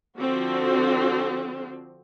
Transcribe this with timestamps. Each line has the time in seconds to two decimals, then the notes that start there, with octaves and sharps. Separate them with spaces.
0.18 D3 F3 C4 F#4